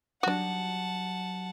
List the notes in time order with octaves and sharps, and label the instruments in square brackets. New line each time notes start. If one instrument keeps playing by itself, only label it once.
[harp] F#3 D#4 G4 [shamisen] D4 F#4 [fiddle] F#5 A5